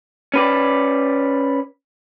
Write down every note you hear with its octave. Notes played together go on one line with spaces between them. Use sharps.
C#4 B4 D5